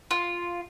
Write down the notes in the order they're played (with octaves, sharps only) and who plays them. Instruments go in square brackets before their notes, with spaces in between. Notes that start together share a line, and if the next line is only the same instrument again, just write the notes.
[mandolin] F4